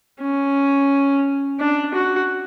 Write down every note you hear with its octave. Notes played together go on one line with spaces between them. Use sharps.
C#4
D4
F#4